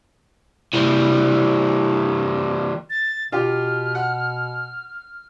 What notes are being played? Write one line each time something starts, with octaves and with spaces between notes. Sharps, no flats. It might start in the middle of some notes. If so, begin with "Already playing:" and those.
E3 G3
A6
B2 F4 G4 F6
F#5